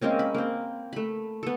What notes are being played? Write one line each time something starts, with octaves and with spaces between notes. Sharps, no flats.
G#3 A#3 C4 C#4
B5
A#3 C4
A3 B5
B3 A4